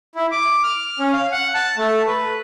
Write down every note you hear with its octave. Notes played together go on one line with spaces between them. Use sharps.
E4
D6
F6
C#4
F5
F#5
A5
A3
B4